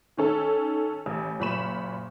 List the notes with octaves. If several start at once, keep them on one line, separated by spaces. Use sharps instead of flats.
D#3 C#4 A4
A1
F#1 A#2 B5 C#6 E7